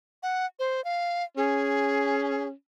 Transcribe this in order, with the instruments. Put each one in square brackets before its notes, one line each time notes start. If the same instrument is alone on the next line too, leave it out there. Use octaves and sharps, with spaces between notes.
[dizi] F#5
C5
F5
[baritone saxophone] C#4 [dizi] G#4